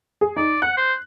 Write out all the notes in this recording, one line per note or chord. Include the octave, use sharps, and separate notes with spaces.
G#4
D#4 D5
F#5 F#6
C5